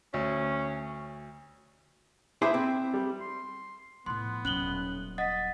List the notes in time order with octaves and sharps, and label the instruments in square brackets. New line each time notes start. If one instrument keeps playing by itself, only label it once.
[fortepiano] D2 [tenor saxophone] C#4
[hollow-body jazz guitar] E4 G#4 C5 [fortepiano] B4 E5 D6
[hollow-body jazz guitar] C4
[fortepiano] G3
[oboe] C6
[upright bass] A2 F3 [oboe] B3 [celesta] C6
[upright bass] D#1 F#3 [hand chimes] C#4 [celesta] F#6 F#7 G7
[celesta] D#5 F#5 [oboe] D#6 [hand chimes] A6 B6